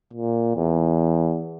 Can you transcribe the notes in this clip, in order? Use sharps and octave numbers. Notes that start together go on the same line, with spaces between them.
A#2
E2